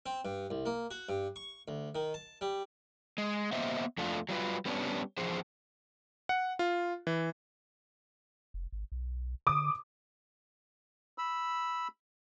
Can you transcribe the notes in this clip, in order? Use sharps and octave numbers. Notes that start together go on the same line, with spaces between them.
C4
G2
C2
A#3
F#4
G2
C#6
D2
D#3
A5
G3
G#3
A#3 B3 C5 D#5 E5
F2 A3 D4 F4
F#3 G3 F4 B4
G3 B3 C#4 D4
E2 F3 G#4 C5
F#5
F4
E3
F1
G#1
B1
D3 D6 D#6
B5 E6